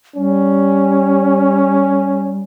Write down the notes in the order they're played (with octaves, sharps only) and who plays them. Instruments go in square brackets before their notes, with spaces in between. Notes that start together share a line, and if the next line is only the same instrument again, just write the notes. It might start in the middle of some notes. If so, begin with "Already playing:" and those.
[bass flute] G3 [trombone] C#4